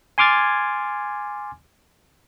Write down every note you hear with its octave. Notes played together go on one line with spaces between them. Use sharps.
G#5 C6 D6 F6 G#6 A6